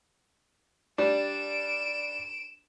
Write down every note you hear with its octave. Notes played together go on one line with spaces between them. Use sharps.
G3 D4 D7 E7